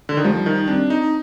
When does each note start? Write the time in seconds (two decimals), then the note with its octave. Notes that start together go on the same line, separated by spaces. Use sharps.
0.09 D3
0.17 D#3
0.24 F3 G3
0.46 D#3
0.68 C4 D4
0.90 D#4